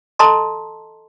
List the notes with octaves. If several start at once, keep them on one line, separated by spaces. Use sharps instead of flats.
A4 D#5 A5 A#5 C6